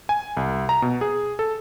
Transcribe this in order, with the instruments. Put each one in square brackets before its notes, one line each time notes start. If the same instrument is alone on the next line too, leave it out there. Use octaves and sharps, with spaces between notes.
[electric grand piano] G#5
C2
A#5
B2
G#4
A4